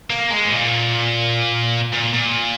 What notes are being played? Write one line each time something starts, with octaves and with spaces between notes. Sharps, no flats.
A#3
G#3
G#2
A#2
A#2
A#2